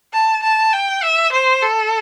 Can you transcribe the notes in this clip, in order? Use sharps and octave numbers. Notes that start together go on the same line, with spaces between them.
A5
A5
G5
E5
C5
A4